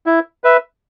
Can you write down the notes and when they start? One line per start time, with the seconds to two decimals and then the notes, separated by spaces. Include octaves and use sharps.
0.06 E4
0.44 B4 E5